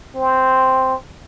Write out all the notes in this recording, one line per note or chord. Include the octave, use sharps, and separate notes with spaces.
C4